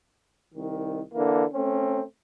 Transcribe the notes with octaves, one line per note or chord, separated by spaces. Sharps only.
C2 D#3
D3 E3 A#3
A3 C4 C#4